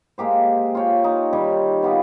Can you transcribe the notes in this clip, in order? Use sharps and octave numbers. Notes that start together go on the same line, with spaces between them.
G#3 A#3 G4 C5
F4 C#5 G5
D#4
D#3 G3 D#4 C#5
B3 F4 G4